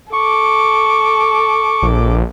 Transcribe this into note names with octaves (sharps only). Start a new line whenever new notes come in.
A4 C#6 D6
A#1